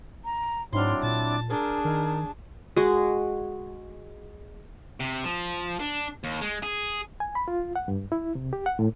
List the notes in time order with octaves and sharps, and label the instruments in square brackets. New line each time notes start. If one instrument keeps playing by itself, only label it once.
[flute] A#5
[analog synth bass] G#2 [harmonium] F#3 C4 E4 [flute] D4 [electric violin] C6 F6
[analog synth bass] A#2 [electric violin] A5
[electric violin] D4 G#4 [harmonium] A#4 [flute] A5
[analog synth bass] D#3 [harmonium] D#4 A#4
[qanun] G#3 F#4
[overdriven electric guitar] C3
F3
D4
D#2
G#3
G#4
[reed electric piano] G#5
B5
F4
F#5
G2
E4
C3
G4
F#5
A2